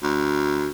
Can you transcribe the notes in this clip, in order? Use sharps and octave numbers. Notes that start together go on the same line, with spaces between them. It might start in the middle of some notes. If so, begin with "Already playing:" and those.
D2